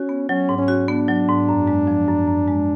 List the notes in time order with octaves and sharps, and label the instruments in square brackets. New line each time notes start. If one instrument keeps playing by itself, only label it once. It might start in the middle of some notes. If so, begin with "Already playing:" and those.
Already playing: [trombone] C#4 [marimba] F#4
[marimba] B3
[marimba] F#3 [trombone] C#4
[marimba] G#2
[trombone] C#4
[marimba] F#4
[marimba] B3 [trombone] D4
[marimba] F#3
G#2
F#2
G#3
F3
F#2
F#2
G#3